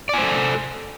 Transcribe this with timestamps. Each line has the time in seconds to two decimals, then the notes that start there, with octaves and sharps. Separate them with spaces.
0.09 D5
0.14 G#5
0.18 C5
0.22 A4